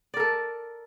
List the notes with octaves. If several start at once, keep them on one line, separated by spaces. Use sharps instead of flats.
A4 A#4 D5